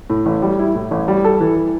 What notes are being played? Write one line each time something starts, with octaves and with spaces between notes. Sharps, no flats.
A2
A1
G3
E4
A2
A1
G3
A4
E3